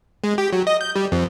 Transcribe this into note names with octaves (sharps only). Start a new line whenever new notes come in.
G#3
G4
F#3
D#5
G6
G3
F2